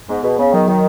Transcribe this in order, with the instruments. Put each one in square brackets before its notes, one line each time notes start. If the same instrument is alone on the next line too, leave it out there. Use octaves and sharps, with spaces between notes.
[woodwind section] G#2 [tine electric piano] B3
[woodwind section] B2 [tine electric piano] G#4
[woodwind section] C#3 [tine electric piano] B3
[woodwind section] D#3 [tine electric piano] F#3
[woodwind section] D#3 [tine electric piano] F#3